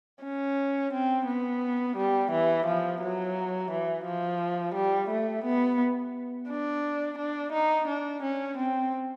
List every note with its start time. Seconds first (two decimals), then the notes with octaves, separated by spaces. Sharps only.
0.23 C#4
0.93 C4
1.27 B3
1.97 G3
2.32 E3
2.66 F3
3.02 F#3
3.71 E3
4.05 F3
4.74 G3
5.09 A3
5.45 B3
6.49 D4
7.18 D4
7.52 D#4
7.88 D4
8.23 C#4
8.57 C4